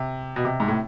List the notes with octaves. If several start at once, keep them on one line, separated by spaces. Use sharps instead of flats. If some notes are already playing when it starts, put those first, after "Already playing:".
Already playing: C3
B2
C3
G#2
A2